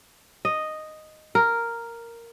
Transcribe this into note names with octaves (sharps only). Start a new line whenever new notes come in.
D#5
A#4